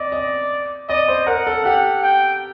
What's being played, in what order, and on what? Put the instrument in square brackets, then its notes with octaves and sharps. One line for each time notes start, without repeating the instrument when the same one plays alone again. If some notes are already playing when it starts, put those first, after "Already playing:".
Already playing: [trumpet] D5 [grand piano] D#5
[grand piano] D#5
[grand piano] D5 [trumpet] D#5
[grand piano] C5
[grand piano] A#4 [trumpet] F#5
[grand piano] A4
[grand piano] G4 [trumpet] F#5
[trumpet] G5